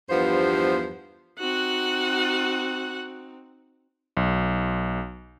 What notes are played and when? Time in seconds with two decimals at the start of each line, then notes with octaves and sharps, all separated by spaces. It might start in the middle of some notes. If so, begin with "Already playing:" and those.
0.10 E2 G2 F3 B3 F4 C5
1.40 C4 D#4 F#4 F#5
4.17 B1